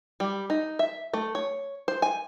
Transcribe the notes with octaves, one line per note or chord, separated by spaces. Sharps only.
G3
D#4
E5
A3
C#5
C5
G#5